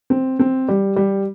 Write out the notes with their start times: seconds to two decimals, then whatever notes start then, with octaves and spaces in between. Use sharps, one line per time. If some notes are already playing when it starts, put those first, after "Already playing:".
0.10 C4
0.39 C4
0.69 G3
0.96 G3